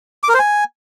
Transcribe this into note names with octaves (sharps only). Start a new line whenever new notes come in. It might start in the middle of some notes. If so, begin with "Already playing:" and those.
D6
A#4
C5
G#5